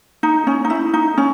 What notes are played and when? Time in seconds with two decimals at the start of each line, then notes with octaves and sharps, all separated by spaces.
0.23 D#4
0.47 C#4
0.65 D#4
0.70 E4
0.94 D#4
1.18 C#4